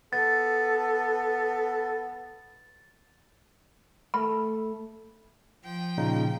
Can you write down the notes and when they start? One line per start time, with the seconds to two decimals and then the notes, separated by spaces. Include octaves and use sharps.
0.13 B3 A4 A6
4.14 A3 B5
5.63 F3 G5
5.98 A#2 C#3 D#4